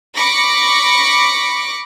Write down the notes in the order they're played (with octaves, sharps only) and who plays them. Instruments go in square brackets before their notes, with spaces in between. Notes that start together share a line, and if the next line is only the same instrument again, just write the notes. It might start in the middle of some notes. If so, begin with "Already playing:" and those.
[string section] B5 C#6 D6 A#6 C#7